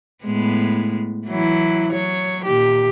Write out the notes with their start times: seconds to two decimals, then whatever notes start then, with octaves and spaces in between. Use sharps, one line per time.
0.25 A2 G#3 B3
1.27 E3 F#3 E4
1.92 F#3 C#5
2.44 A#2 D#3 G4